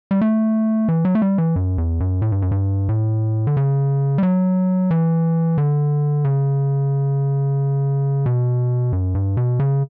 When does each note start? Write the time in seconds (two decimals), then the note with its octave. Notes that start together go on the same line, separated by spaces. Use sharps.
0.11 G3
0.21 A3
0.89 E3
1.05 F#3
1.15 A3
1.22 G3
1.38 E3
1.56 F#2
1.78 E2
2.00 F#2
2.22 A2
2.32 G2
2.42 F#2
2.51 G2
2.89 A2
3.47 D3
3.57 C#3
4.18 G3
4.23 F#3
4.91 E3
5.58 D3
6.25 C#3
8.26 B2
8.93 F#2
9.15 G2
9.37 B2
9.60 C#3